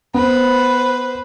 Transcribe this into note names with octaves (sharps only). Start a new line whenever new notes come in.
B3 B4 C5